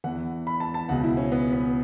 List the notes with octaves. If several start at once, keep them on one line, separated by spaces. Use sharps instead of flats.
E2 E3 F#5
B5
A5
A5
C#2 B2 F#5
E4
C#4
B3
B3